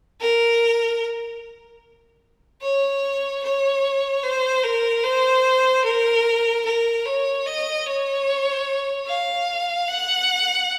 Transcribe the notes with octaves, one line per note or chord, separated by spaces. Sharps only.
A#4
C#5
C#5
C5
A#4
C5
A#4
A#4
C#5
D#5
C#5
F5
F#5